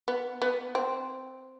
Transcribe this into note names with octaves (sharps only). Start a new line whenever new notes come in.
B3
B3
C4